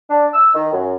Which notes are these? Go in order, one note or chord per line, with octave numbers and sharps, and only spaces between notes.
D4
E6
D#3
F#2